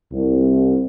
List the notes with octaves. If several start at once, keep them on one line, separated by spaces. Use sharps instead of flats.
C2